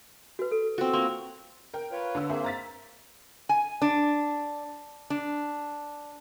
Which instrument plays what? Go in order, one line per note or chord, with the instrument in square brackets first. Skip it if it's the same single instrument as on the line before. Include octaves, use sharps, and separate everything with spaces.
[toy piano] F#4 B4
A4
[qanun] C4 F#4
[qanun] A#3 [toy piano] F4 C6
[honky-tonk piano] A#4 G5
[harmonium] F4 B4 C#5
[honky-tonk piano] D3 E6
[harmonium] A#3 C5 [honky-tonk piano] C4 G#4 E5
[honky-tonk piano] A#5 A6 B6
[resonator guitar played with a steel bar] G#5
D4
D4